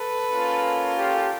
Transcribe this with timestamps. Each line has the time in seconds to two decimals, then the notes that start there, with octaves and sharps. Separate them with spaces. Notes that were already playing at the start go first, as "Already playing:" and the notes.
Already playing: A4 B4
0.31 A#3 C#4 F4
0.95 G4 A4